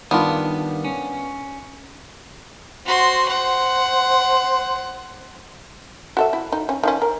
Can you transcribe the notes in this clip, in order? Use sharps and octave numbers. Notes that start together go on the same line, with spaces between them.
G2 D#3 B3 D4 F4
C#4
F#4 C5 C6
C5 F#5
F#4 A4 E5
E4
D#4
C#4
D#3 F3 C#4
A#4